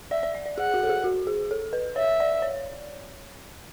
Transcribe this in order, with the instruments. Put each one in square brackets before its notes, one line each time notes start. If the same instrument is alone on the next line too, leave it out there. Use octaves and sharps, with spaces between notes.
[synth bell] D5 [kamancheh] E5
[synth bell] D5
E5
D5
[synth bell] G#4 [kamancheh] F#5
[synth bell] F#4
A4
G#4
F#4
G#4
A4
B4
[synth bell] C#5 [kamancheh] E5
[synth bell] D5
C#5